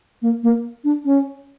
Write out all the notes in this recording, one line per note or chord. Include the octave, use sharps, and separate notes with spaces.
A#3
A#3
D4
C#4